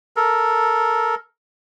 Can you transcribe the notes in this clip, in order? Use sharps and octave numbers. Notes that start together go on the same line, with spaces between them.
A4 A#4